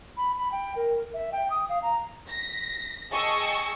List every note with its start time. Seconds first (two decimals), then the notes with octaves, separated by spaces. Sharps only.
0.17 B5
0.37 B5
0.52 G5
0.76 A#4
1.14 E5
1.32 G5
1.50 D#6
1.69 F5
1.82 A#5
2.28 A#6 B6
3.12 G#4 D#5 G5 A5 C#6 E6